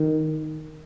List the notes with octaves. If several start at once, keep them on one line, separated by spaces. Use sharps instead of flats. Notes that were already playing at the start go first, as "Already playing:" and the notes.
Already playing: D#3